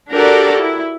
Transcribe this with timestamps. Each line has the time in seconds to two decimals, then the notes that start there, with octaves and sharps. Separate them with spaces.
0.13 D4 F#4 G4 A4 A#4 D5
0.60 E4